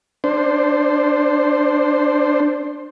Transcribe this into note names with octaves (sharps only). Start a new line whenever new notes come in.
D4 C5